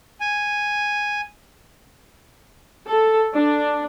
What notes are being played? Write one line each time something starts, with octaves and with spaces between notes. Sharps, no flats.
G#5
A4
D4